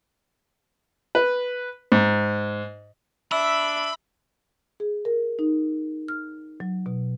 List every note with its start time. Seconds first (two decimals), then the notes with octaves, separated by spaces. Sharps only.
1.15 B4
1.92 G#2
3.32 D4 E5 B5 E6
4.80 G#4
5.05 A#4
5.39 D#4
6.08 F6
6.60 F#3
6.86 B2